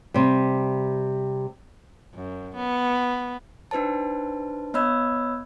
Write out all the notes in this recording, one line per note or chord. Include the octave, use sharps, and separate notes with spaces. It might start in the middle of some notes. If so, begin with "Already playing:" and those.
C3 G3
F#2
B3
D4 D#4 B4 C5 A5
B3 C#5 D#5 B5 E6 G#6